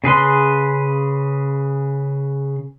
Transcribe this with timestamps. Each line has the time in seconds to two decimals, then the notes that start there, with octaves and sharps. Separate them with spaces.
0.04 C#3 G#4 B4 C6